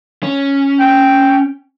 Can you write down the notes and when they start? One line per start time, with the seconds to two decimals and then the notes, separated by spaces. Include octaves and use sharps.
0.23 C#4
0.80 G5